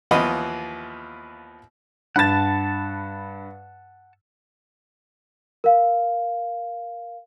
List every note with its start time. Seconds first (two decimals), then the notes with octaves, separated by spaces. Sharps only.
0.11 D#2 E3 F3 B3 D#5 B5
2.16 G2 F#5 A5 B5 A6
5.64 A#4 F5